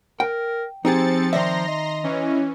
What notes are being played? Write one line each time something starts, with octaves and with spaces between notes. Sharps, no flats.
A#4 G5
F3 C4 D#4 G4 G#4 A6 C#7
D#3 D5 E5 A#5 C6 A#6
D#5
E3 C#4